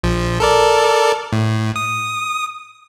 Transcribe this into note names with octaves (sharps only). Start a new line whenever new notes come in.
A#1 F3
A4 A#4 D5
A2
D#6